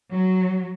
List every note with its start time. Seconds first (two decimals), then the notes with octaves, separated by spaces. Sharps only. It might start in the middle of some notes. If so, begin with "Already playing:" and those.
0.13 F#3